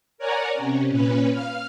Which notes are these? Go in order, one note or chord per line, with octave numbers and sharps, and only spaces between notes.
A#4 C#5 D5 F#5 G#5 A#5
C3 C#4
A#2 C#4 B4
F5 F6